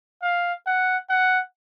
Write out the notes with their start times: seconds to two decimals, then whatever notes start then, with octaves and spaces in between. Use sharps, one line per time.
0.22 F5
0.66 F#5
1.09 F#5